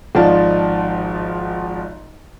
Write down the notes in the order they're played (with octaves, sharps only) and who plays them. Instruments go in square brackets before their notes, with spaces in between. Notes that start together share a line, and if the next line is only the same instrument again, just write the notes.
[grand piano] G#1 F3 D#4 F4 D5 A5